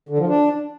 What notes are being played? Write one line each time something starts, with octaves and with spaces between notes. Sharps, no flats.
D3
F3
D4